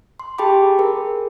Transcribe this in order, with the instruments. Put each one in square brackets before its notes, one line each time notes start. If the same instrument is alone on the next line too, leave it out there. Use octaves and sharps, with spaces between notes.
[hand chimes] C6
G4 G#4 G5 A5 B5 D6
G#4 A#4